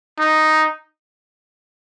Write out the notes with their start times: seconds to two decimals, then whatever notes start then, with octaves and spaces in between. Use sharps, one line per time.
0.20 D#4